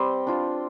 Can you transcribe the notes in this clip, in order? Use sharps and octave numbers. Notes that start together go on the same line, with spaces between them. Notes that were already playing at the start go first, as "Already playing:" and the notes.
Already playing: G3 C4 C5
D4 F4